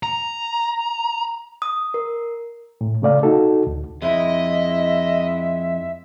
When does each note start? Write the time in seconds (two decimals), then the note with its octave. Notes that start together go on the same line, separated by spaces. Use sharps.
0.03 A#5
1.62 D#6
1.94 A#4
2.81 A2
3.02 C#3 A3 D5 F5
3.23 D#4 F#4 A4
3.67 D2
4.02 F2 G#3 E4 D#5 E5